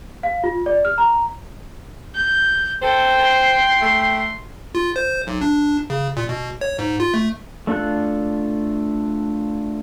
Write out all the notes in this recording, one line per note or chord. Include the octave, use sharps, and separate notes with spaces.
F5
F4
D5
F6
A#5
G6
A4 C5 G5
C6 C7
A3
F4
C5
B1
D4
C#3
A#2
B2
C#5
G#2
F4
A3
A3 D4 F4 A4 F#6